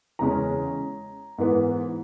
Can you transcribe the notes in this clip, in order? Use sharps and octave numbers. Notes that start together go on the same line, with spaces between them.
E2 C#3 G#3 C#4 A#5
G#2 E3 B3